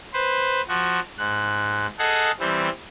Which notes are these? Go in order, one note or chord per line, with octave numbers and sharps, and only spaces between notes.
B4 C5
F3 F#4
G#2 F#6
G#4 A4 D#5 F5 F#5
E3 G3 C4